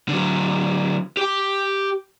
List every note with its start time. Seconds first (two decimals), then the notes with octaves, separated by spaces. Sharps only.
0.09 D3 F#3
1.17 G4 G5